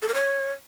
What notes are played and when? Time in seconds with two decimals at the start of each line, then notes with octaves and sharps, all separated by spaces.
0.02 A4
0.08 A#4
0.14 C#5